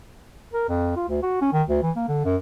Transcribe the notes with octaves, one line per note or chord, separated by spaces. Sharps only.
A#4
F2
F4
D2
F#4
C#4
D#3
D2
E3
A#3
D3
F#2